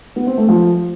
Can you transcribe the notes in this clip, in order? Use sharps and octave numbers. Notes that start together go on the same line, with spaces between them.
B3
C4
A3
F3